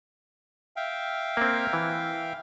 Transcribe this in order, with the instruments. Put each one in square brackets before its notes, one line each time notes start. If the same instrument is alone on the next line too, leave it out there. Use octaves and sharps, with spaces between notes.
[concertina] E5 F5 G5
[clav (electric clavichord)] A#3 C4
E3